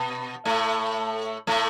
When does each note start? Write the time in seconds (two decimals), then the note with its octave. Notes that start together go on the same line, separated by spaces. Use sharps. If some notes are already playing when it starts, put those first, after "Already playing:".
Already playing: B2 B3
0.45 A2 A3
1.47 A2 A3